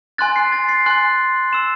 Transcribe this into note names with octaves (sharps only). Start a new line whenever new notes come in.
G#5 C6 F#6 A6
C7
A6
C7
G#5 C6 F#6
C6 E6 E7